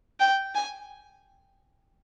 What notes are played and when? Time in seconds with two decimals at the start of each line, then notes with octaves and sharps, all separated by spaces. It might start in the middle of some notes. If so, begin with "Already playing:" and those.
0.20 G5
0.55 G#5